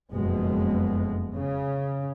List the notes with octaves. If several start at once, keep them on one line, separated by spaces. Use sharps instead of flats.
F#1 F2 B2 G#3
C#3